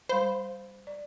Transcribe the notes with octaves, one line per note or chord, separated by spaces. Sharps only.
G3 C5 F5 B5
D5